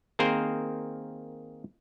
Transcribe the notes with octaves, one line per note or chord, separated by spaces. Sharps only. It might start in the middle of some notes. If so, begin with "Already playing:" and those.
D#3 A#3 C4 G#4 A#4 C5